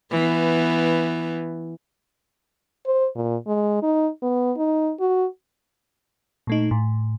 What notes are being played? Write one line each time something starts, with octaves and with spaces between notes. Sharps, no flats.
E3 B3
C5
A#2
G#3
D#4
B3
D#4
F#4
A#2 A3 D#4
A2